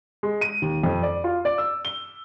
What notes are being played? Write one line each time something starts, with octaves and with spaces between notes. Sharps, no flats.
G#3
D#7
D#2
F2
D5
F4
D5
E6
G7